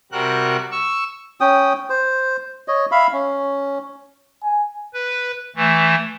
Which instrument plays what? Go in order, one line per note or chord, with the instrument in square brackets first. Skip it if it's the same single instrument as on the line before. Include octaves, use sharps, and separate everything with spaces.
[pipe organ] C3 G3 F#4 A#4 F#6
C#6 E6
[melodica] C#4 G5 D#6
C5
C#5 D#5
E5 F5 B5
C#4
[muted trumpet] G#5
[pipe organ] B4
E3 A3